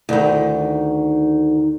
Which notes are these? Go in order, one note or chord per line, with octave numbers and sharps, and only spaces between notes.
D2 D#3